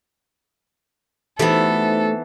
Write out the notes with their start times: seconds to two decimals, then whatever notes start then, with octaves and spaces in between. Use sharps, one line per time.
1.39 E3 A3 B3 D#4 F#4 G4 A4 C5